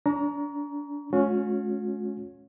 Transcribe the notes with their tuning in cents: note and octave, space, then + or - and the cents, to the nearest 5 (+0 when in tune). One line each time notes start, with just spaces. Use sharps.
D4 -30 A#5 +10 C#6 +45
G#3 +45 C#4 +0 F#4 -45